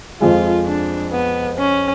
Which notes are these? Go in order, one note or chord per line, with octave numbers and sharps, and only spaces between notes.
F2 F3 G#3 F4
D4
B3
C#4